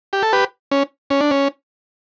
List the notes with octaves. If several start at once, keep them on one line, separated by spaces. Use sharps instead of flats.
G4
A4
G4 B4
C#4
C#4
D4
C#4